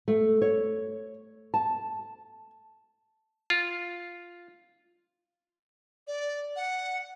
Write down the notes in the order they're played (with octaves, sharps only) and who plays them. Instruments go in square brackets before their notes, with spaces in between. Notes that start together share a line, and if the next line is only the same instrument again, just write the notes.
[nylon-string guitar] A3
C#5
A5
[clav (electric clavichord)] F4
[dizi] D5
F#5